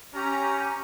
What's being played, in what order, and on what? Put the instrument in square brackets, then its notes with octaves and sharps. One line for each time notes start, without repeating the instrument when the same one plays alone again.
[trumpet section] C#4 [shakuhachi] G4 [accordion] A#5